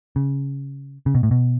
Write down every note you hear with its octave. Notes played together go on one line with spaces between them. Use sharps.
C#3
C#3
B2
A2
B2